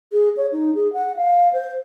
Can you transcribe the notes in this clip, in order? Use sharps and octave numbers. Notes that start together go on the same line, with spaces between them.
G#4
C#5
D#4
G#4
F#5
F5
C5